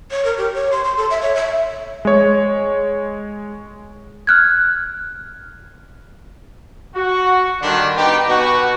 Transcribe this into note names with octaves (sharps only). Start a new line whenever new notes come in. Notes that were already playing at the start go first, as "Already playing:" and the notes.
C#5
A#4
G4
C#5
C6
C6
A4
E5
C#5
E5
G#3 C#5
F6 F#6 G#6
F#4
D3 D#3 G3 D4
B3 D#4 G4
B2 F#4